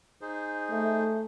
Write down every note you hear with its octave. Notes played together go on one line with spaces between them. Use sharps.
D#4 G#4 C5
A3